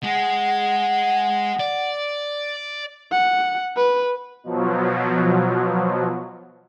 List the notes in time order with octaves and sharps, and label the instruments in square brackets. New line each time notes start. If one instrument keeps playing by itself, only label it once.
[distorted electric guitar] G#3 G#4 [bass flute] F#5
[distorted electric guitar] D5
[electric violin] F#5
B4
[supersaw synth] B2 F3 F#3